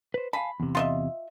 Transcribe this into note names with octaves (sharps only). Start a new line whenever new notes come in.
B4 C5
F5 G#5 A5 B5
E2 C3
F4 D#5 E5